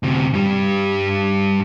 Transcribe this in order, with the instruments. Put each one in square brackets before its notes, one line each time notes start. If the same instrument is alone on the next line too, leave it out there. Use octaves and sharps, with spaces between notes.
[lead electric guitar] D2 C3
G2 G3